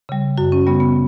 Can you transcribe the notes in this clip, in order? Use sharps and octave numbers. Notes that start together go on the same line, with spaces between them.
C#3 G3
F#2 F#4
C#4
C#3 G3 B3
B3